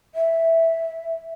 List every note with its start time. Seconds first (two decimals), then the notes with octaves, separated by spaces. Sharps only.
0.15 E5